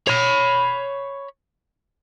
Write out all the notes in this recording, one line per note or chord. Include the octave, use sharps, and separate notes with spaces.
C#5 B5